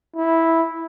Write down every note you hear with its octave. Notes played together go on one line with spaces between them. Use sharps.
E4